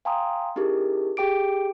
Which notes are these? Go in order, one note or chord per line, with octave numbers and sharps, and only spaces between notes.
F5 G5 G#5 A#5 C6 D#6
C#4 D#4 E4 G4 G#4 A#4
G4 G#4 G5 D6 D7